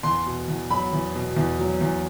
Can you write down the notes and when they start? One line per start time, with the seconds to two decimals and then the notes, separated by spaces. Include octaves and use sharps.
0.03 E2 C6
0.26 B2
0.48 E2
0.71 F#3 B5
0.93 E2
1.15 B2
1.36 E2
1.59 F#3
1.81 E2